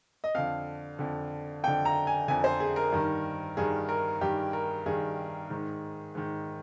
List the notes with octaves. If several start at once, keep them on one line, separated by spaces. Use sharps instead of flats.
D#5
F2 D3 F5
F2 D3
F2 D3 G5
A#5
G#5
F2 D3 G#5
C5
G#4
A#4
G2 D#3
G2 D#3 G#4
A#4
G2 D#3 G4
A#4
G2 D#3 G#4
G#2 D#3
G#2 D#3